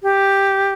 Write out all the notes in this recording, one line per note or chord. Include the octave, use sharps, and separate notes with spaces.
G4